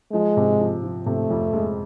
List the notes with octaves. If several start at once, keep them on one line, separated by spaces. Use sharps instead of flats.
F3 G#3
C3
F3
F3
C3 A3
F2
G#3